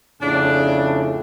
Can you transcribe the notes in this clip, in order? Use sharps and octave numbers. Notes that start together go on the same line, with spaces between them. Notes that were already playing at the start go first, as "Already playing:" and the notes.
F2 A2 C#3 D4